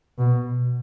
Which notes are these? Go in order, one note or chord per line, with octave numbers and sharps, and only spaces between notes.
B2